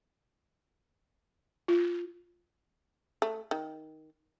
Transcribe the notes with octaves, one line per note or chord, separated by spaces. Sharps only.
F4
A3
D#3